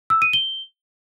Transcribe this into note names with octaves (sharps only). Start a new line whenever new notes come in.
E6
D#7
G7